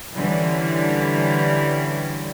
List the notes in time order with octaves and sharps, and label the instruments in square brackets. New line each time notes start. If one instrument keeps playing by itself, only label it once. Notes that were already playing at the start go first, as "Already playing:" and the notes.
[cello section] D3 E3 G3 C#4